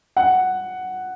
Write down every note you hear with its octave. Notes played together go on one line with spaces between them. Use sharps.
F#5